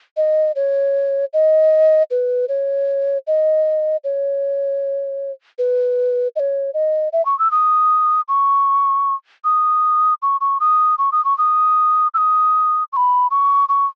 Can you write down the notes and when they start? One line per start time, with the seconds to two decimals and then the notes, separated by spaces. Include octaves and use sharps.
0.17 D#5
0.55 C#5
1.33 D#5
2.10 B4
2.48 C#5
3.27 D#5
4.04 C#5
5.58 B4
6.36 D#5
6.39 C#5
6.74 D#5
7.13 E5
7.25 C#6
7.39 E6
7.51 D#6
8.28 C#6
9.44 D#6
10.22 C#6
10.41 C#6
10.60 D#6
10.98 C#6
11.12 D#6
11.25 C#6
11.38 D#6
12.14 E6
12.17 D#6
12.92 C#6
12.96 B5
13.30 C#6
13.69 C#6